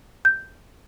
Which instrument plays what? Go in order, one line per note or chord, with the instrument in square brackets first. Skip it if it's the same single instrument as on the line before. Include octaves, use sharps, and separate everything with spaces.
[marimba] G6